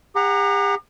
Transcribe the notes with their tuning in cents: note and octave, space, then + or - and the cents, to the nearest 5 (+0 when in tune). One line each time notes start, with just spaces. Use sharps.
G4 +45 F#5 +0 A#5 +0